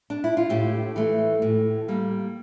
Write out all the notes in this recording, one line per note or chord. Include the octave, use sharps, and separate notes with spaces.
D4
E4
F4
A2 E4 G4
E3 A3
A2
G3 A#3